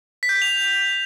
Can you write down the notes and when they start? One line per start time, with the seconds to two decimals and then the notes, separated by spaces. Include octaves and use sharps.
0.23 B6
0.29 G6
0.35 B6
0.42 F7